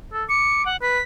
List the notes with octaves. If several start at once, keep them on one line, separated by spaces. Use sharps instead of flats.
A4
D6 C#7
F#5
B4 B6